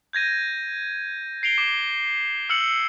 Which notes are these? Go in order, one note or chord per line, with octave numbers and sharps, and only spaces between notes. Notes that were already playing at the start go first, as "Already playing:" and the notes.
G6 G#6 A#6 D#7
C7 D7 F7 G7
D6
E6 F6 C#7 F#7